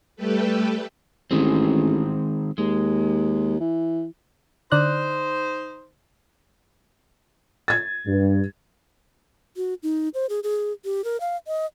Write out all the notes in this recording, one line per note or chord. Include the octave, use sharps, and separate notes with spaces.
G3 A3 G4 A4 B4
A1 D#3 G#3 C4
D#2 G#3
E3
D3 D#4 C5 D5 F#6
G#6 A6
G2
F#4
D#4
C5
G#4
G#4
G4
A#4
F5
D#5